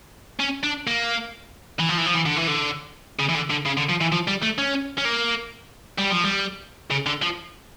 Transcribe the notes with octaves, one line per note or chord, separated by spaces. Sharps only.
C#4
D4
A#3
E3
F3
E3
F3
E3
D3
E3
D3
C#3
E3
D3
D3
C#3
D3
F3
E3
F3
G3
A3
C#4
C#4
A#3
G3
F3
G3
C#3
D3
F3